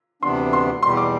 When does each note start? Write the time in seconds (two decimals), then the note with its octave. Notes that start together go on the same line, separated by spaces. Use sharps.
0.22 D2 C3 E3 B3 D4 C6
0.53 C6
0.82 E2 B2 G3 C6
0.97 D6